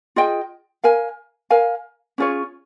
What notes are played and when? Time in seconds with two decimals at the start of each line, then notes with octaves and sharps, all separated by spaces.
0.16 F4 G#4 D#5 G5
0.84 A#4 F5 G#5
1.50 A#4 F5 G#5
2.18 C#4 F4 G#4 C#5